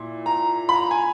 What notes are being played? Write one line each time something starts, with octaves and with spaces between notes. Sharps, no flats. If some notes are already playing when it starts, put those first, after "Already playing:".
Already playing: A#2 E4
A#5
B5
A#5
G#5